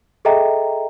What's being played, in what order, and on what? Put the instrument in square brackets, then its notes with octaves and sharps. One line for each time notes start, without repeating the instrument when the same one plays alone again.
[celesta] G#4 A4 D#5 E5 G5 A#5